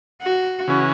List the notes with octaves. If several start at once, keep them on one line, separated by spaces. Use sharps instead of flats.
F#4
C#3 E3 C#4 F#4